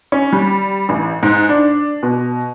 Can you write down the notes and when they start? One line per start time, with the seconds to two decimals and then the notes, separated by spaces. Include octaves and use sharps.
0.12 C#4
0.33 G3
0.89 A1
1.23 G#2
1.49 D4
2.03 B2